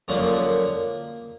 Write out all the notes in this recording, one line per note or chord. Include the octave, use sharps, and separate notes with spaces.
F#2 D3 F3 G#3 A#3